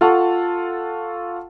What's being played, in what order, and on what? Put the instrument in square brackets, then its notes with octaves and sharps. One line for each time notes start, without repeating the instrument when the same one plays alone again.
[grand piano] F4 A4 F5 F#5 A5 C#6